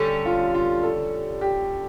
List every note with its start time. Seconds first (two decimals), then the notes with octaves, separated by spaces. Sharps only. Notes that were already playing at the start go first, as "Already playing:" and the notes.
Already playing: D3 G3 C#4 A4
0.25 F4
0.54 F4
0.83 A4
1.41 G4